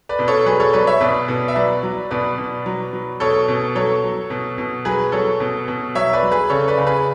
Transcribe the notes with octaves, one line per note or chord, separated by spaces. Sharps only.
B4 D5
B2
A4 C#5
F#3 G#4 B4
A4 C#5
F#3 B4 D5
C#5 E5
B2 B4 D5
B2
E5
F#3 B4 D5
F#3
B2 B4 D5
B2
F#3
F#3
B2 A4 C#5
B2
F#3 A4 C#5
F#3
B2
B2
F#3 G#4 B4
F#3 A4 C#5
B2
B2
F#3 C#5 E5
B4 D5
F#3
G#4 B4
C#3 A4 C#5
B4 D5
C#3
G#4 B4